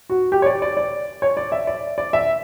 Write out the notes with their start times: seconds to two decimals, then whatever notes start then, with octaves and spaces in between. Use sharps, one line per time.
0.10 F#4
0.32 G4
0.42 C#5
0.46 D5
0.62 D5
0.77 D5
1.22 C#5
1.37 D5
1.52 E5
1.67 D5
1.98 D5
2.13 E5